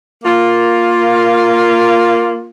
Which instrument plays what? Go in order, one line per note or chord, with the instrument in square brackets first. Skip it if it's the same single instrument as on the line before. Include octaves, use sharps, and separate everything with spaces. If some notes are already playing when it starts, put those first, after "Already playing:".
[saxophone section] A#3 F4